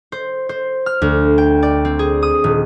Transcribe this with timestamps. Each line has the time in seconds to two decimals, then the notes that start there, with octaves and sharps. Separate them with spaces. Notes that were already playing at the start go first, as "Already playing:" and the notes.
0.12 C5
0.49 C5
0.86 F6
1.02 D2
1.38 G5
1.63 D5
1.85 C4
1.99 G#4
2.23 D#6
2.44 D#1